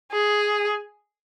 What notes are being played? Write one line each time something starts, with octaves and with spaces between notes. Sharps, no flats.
G#4